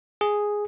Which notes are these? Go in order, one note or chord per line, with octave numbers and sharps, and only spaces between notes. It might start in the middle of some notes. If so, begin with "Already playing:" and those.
G#4